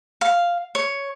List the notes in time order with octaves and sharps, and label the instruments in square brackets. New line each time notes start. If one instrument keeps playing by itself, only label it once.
[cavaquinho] F5
C#5